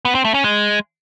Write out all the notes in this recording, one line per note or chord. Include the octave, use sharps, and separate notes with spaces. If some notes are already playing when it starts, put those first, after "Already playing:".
B3
C4
A3
C#4
G#3